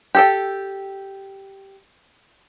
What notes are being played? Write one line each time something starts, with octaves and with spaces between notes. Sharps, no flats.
G4 A4 G5